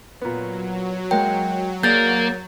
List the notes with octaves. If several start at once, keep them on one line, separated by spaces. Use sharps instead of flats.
A#2 F#3 B3
G#3 A#3 G5
A#3 G#4 D5 G6 A6